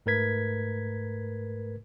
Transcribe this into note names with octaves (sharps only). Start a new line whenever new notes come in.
G#2 A3 A#4 B4 G#6 B6